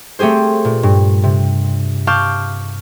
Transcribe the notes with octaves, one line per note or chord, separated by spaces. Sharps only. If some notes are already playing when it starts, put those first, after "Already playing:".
A3 C4 G4 G#4 C5
A#2
G2
C3
F5 A5 C#6 D6 F6 G6